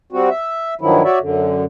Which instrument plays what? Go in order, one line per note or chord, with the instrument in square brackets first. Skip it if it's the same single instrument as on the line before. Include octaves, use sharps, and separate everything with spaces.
[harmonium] G3 C4 F#4
E5
G2 D#3 F3 F#3 E4
F#4 C#5 D5 E5
F#2 D3